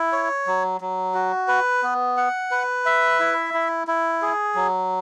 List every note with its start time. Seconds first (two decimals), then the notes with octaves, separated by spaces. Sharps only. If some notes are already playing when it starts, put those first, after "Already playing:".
Already playing: E4
0.12 C#5
0.47 F#3
0.81 F#3
1.14 F#4
1.48 B4
1.83 B3
2.17 F#5
2.51 B4
2.85 E5
3.19 E4
3.54 E4
3.87 E4
4.22 G#4
4.55 F#3